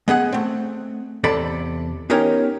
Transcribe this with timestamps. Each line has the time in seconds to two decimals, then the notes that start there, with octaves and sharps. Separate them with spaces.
0.08 G#3 B3 G#4 F#5
0.32 A3 C4
1.24 E2 C3 A4 D5 B5
2.10 B3 C#4 D#4 G4 A#4 C#5